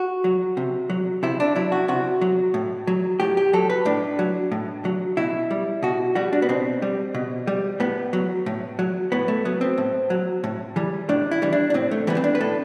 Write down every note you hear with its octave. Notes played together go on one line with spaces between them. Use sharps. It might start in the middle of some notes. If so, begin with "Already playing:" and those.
Already playing: F#4
F#3
C3
F#3
C3 E4
D4
F#3 E4
F#4
C3 F#4
F#3
A2
F#3
A2 G4
G4
F#3 A4
B4
A2 D4
F#3
A2
F#3
B2 E4
G3
B2 F#4
G3 F#4
D4
B3
B2 C4
G3
B2
G3
A2 B3
F#3
A2
F#3
A2 B3
A3
F#3 B3
C4
A2
F#3
A2
E3 G3
A2 D4
E4
E3 G3
D4
D4
A2 C4
A3
E3 G3 B3
C4
D4
B4
A2 A4